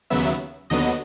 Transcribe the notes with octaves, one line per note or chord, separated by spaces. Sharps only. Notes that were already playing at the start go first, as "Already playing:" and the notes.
D#2 C#3 F#3 B3 E5
D#2 D3 F#3 B3 D#5